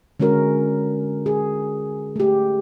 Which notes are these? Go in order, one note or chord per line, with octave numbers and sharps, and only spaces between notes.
D3 G#3 C#4 F#4 A#4
G#4
A3 G4